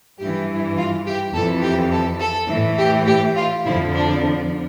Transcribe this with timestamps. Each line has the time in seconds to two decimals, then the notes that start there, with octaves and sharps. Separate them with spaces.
0.19 G2 E3 G4
0.77 F4
1.05 G4
1.34 F2 E3 A4
1.63 G4
1.92 A4
2.20 A4
2.50 A2 E3
2.79 G4
3.07 G4
3.36 F4
3.65 F2 D3 F3 E4
3.94 D4